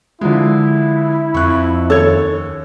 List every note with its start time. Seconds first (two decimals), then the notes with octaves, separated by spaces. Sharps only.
0.21 D3 F3 G#3 E4
1.34 F2 C#6 F#6
1.90 D#2 C#4 A4 C#5